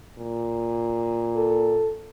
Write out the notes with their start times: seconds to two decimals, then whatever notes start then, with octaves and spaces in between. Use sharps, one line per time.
0.18 A#2
1.37 A4